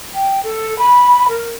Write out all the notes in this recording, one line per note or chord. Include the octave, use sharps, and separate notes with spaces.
G5
A4
B5
A#4